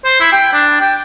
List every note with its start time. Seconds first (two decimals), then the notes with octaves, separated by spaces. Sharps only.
0.04 C5
0.20 E4
0.32 G5
0.53 D4
0.80 G5